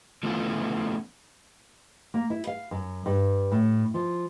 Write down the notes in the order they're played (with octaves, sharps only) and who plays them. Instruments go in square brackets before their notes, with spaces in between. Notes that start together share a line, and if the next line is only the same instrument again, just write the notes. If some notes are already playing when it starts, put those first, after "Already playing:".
[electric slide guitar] F3 A3 B3 C#4 E4 F4
[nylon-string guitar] A#3
E4
F5
F#2
G2
A2
F3